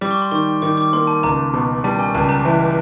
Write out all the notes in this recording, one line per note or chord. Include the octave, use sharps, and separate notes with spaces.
G3 D6
C#6
C6
D#3 C#6
D#3 D6
D6
A#3 C6
A5
C#2 A#5
B2
G3 A5
G#5
C#2 A5
A#5
E3